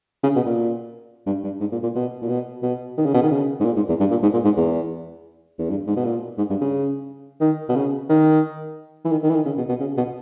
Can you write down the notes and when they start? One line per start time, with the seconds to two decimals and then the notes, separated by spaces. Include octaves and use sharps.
0.23 C#3
0.36 B2
0.46 A#2
1.26 G2
1.44 G2
1.60 G#2
1.72 A#2
1.83 A#2
1.95 B2
2.22 A#2
2.29 B2
2.63 B2
2.97 D#3
3.06 C#3
3.14 B2
3.23 D#3
3.31 C#3
3.60 G#2
3.65 A#2
3.76 G#2
3.88 E2
4.00 G2
4.11 A#2
4.23 G#2
4.33 A#2
4.45 G#2
4.56 E2
5.58 E2
5.70 G2
5.87 G#2
5.96 B2
6.05 A#2
6.38 G#2
6.50 G2
6.61 C#3
7.41 D#3
7.69 B2
7.75 C#3
8.09 D#3
9.05 E3
9.12 D#3
9.23 D#3
9.30 E3
9.35 D#3
9.46 C#3
9.57 B2
9.69 B2
9.80 C#3
9.97 B2